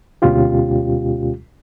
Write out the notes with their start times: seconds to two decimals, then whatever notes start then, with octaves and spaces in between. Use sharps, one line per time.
0.22 D2 B2 G#3 C#4 F4 G4